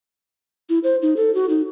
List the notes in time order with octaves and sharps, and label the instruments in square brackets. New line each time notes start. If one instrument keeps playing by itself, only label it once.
[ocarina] E4
C5
D#4
A4
F#4
D#4